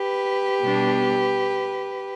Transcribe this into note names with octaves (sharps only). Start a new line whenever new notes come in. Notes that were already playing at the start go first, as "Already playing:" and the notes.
Already playing: G4 B4
B2 G3 B3 D4